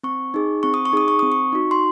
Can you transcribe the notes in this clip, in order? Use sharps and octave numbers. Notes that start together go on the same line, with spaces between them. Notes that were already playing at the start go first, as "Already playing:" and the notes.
C4 C#6
D#4 G#4
C4 C#6
D#6
C#6
D#4 G#4 D#6
C#6
C4 D#6
C#6
D#4 F#4
C6